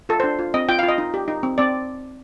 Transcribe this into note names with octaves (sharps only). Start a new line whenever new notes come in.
F4 A4
D4 C5
F4
C4 D#5
F4 G5
F5
F4
D#5
D#4
G4
D#4
C4
C4 D5